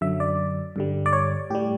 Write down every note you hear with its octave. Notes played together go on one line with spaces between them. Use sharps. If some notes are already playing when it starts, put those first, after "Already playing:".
F#2 D3 F#3 E5
D5
G2 D3 G3
D5
C#5
A2 G3 G4